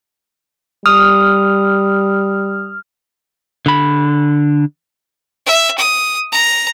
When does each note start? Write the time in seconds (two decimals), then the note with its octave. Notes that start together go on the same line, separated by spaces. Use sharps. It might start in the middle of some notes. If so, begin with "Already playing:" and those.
0.86 G3 D#6 F6
3.66 D3 B5
5.46 E5
5.78 D#6
6.32 A#5